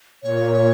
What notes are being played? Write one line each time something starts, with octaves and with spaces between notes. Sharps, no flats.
A#2 C#5